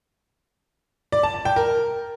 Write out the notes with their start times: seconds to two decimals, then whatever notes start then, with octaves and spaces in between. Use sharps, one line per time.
1.12 D5
1.23 A5
1.34 A5
1.45 G5
1.56 A#4